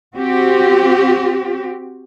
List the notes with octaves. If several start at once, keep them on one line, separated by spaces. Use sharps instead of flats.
C4 F#4 G4